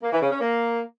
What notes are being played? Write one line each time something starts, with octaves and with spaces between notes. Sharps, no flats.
A#3
E3
C#3
C#4
A#3